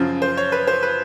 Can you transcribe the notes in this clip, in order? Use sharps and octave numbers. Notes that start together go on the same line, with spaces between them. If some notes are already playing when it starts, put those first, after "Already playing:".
Already playing: F#2 C#3 F3
C5
C#5
B4
C5
B4